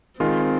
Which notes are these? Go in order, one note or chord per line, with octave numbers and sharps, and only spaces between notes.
D#3 G#3 C4 F4